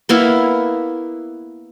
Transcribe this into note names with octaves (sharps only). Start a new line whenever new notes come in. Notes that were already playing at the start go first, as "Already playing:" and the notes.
A#3 B3 E4 F5